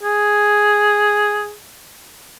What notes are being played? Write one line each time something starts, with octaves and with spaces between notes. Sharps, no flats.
G#4